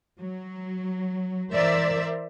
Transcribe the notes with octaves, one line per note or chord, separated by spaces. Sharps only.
F#3
E3 A#4 C5 D5 E5